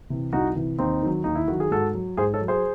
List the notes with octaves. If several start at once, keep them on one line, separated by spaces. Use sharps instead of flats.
C3 E3
C2 D#4 F#4
C3 E3
D#2 C4 D#4
D#3 F#3
D#2 D#4
E4
D#3 F#3 F#4
G#4
G#2 F#4 A4
F#3
G#2 G#4 C5
A4 C#5
F#3
G#4 C5